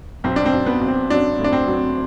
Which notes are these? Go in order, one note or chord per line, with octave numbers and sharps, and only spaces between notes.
B1 C4
D4
C4
B1
B3
B1
C4
F#3 D4
A2
D4
C4
F#3